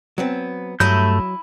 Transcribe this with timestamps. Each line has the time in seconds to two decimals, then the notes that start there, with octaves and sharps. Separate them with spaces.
0.18 F#3 B3 C4
0.80 G2 F#3 A3 E4 D#5 E5 G6